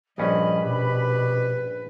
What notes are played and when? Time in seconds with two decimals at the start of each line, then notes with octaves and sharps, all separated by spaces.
0.18 A#1 G2 F3 G3 C#4 D#5 B5
0.64 B2 G4 B4